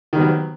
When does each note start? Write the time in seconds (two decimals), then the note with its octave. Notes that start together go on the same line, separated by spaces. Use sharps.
0.13 D#3
0.16 G3
0.18 B3
0.21 F#3